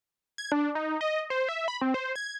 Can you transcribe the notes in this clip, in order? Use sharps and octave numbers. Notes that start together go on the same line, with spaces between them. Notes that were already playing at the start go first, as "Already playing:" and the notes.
G#6
D4
D#4
D#5
C5
E5
B5
C4
C5
G#6